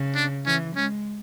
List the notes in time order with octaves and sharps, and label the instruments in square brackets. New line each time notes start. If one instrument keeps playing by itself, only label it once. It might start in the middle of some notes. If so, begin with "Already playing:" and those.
Already playing: [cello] C#3
[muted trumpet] D4
[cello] E3 [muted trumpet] C#4
[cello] G#3 [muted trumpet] C#4